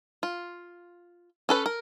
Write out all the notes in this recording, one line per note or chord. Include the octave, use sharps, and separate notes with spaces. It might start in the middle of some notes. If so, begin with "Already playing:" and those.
F4
C#4 A4 B4
A#4